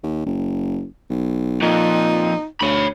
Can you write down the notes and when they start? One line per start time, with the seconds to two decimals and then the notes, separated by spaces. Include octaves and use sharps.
0.03 D#2
0.26 F#1
1.10 B1
1.62 F2 A#2 D#4
2.61 D2 C#5 B5